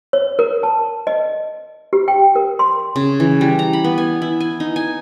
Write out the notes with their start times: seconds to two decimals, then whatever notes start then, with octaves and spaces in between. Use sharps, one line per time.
0.13 C#5
0.39 A#4
0.63 A5
1.07 D#5
1.93 G4
2.08 G5
2.36 A#4
2.59 C6
2.96 C#3
3.20 E3
3.41 G3
3.59 A#5
3.73 B5
3.84 B3
3.98 G#5
4.22 E4
4.40 G#5
4.60 D#4
4.76 G#5